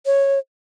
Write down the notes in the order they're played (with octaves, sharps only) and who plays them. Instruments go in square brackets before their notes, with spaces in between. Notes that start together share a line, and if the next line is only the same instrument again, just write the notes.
[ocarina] C#5